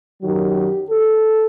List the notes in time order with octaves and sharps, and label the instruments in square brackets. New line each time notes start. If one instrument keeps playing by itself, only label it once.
[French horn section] F#2 D#3 F#3 G4
A4